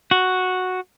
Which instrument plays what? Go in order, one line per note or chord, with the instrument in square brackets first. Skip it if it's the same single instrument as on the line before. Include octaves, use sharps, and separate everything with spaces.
[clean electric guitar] F#4